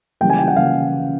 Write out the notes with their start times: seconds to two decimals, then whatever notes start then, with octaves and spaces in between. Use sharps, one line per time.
0.21 C#3 E3 G3 A#3 G5
0.30 G#5
0.39 G5
0.48 F#5
0.56 C#3 E3 G3 A#3 F5